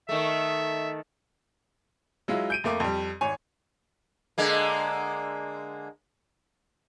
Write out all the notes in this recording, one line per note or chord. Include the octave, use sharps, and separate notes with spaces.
D#3 A3 E5
F#3 G#3 E4 F4
G6 D7 D#7
F2 A3 A#3 D6
F2 G3
G#1 C#5 G#5
D3 G#3 A#3